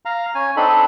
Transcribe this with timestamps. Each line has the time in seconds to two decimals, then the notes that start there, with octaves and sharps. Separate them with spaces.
0.05 F5 A#5
0.35 C#4 G#5
0.57 C4 D4 D#4 A4 B5